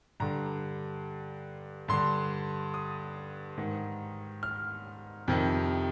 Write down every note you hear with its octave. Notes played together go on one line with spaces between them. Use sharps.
G2 D3 A#5
G2 D3 C6
D#6
G#2 D#3
F6
F2 C3 D#3